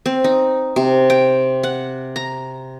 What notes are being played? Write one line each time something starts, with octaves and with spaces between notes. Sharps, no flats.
C4
D#4
C3
G5
F#5
A#5